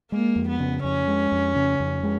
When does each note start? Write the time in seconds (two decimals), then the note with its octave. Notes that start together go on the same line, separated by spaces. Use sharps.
0.11 G#3 A#3
0.36 F2
0.48 B3
0.60 C#3
0.84 F2 C#4
1.08 G#3
1.32 F2
1.56 C#3
1.80 F2
2.03 G#3